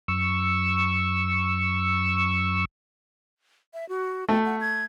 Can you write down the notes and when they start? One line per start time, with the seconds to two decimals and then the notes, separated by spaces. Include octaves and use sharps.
0.08 F#2 C#6 E6
3.74 E5
3.89 F#4
4.29 A3 G5
4.45 F#5
4.61 G#6